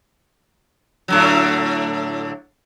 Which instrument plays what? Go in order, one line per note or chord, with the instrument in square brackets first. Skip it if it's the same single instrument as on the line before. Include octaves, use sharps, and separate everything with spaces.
[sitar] A2 D3 F#3